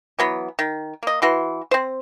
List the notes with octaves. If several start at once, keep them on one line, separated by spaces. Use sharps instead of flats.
E3 F#3 B3
D#3
A#3 D#5
E3 F#4 C6
C4 C5